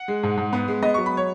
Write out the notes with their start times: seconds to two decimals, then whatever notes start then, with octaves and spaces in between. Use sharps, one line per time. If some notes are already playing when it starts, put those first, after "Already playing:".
Already playing: F#5
0.08 G#3
0.23 G#2
0.37 G#2
0.53 B3
0.68 G#3
0.82 B3 D#5
0.94 C#6
0.98 F#3
1.06 B5
1.17 C#5